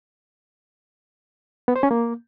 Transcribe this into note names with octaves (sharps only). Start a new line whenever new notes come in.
B3
C5
C#4
A#3